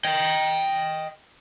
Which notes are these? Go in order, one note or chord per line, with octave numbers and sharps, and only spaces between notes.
D#5 G5